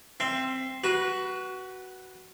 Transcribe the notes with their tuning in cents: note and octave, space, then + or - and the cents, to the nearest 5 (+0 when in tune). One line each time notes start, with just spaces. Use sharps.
C4 +0 E5 +25
F#4 +15 B4 -15